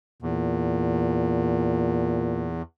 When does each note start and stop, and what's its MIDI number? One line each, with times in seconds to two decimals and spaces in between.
0.22 2.62 40
0.22 2.57 46